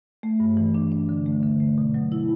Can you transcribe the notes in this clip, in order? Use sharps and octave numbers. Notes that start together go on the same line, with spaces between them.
A3
G2
E3
D4
D4
D3
A3
D3
A3
B2
F#3
E4